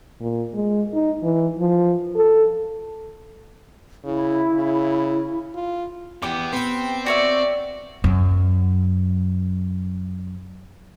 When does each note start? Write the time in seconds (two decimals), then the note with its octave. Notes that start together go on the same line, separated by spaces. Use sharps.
0.21 A#2
0.54 G#3
0.94 D#4
1.23 E3
1.59 F3
2.16 A4
4.04 C#3 E4
4.54 C#3
5.55 F4
6.22 E2 B3 G4 D6
6.53 B3 C4 G5
7.06 F#4 C#5 D5 E5
8.04 F#2 F#3